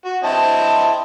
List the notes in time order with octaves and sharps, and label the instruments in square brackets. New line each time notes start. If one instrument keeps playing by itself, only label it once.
[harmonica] F#4
[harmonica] C4 E4 D#5 [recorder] A5